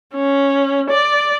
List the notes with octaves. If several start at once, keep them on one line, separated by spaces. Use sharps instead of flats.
C#4
D5